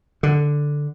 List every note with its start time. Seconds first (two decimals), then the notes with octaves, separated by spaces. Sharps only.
0.23 D3